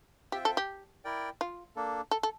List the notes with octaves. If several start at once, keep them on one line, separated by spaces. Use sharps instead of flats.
C4 F4 G4 C5 E5 G5
A4
G4
E4 A#4 D5 G5
F4
A#3 D4 A4
A4
A4